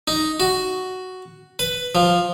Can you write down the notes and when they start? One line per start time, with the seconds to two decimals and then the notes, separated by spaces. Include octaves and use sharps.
0.08 D#4
0.40 F#4
1.59 B4
1.95 F3